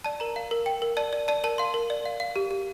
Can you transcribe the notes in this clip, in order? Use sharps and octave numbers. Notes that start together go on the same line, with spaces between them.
D5 A5
A#4 A#5
F5
A#4
G5
A#4
D5 A5
D5
D5 A5
A#4 A5
F5 C6
A#4
D5
F5
F5
G4
G4